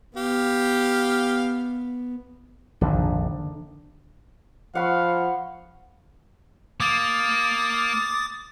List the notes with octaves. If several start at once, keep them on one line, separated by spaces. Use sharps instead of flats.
B3 G4 F5
A#1 F2 G#2 D3 D#3
F3 F5 F#5 B5 C#6
A#3 D6 D#6 A6